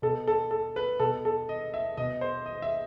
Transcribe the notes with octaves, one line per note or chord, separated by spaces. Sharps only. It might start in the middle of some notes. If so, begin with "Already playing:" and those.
B2 A4
A4
A4
B4
B2 A4
A4
D#5
E5
B2 D#5
C5
D#5
E5